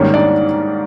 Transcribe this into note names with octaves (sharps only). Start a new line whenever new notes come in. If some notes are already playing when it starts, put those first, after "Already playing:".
Already playing: G#2 D#3 G3 A#3 C#4 C#5
D4 D5